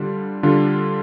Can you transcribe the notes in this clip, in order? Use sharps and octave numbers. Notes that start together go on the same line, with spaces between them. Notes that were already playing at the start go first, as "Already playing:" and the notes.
Already playing: D3 G3 D4 F4
D3 G3 D4 F4